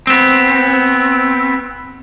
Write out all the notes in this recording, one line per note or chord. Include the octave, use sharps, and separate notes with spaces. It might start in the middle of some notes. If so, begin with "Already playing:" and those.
B3 C4